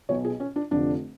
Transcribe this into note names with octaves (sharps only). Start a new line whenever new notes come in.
B1 B2 C#5
G#4
C#4
D4
F1 F2 D3 F3 D4